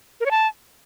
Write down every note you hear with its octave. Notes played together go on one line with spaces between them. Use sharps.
A#4
C#5
A5